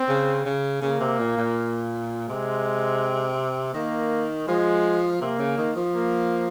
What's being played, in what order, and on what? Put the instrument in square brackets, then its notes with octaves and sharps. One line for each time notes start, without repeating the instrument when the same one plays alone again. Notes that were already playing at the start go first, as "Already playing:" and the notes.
Already playing: [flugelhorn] C4
[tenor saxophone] C#3
C#3
[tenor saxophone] C#3 [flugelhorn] A#3
[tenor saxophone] C3
A#2
A#2
[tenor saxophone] C3 [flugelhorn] G#3
[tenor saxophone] D#3 [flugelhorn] A#3
[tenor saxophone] F3 [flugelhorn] G#3
[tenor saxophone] C3 [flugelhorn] A#3
[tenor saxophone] C#3
D#3
F3
[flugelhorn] A#3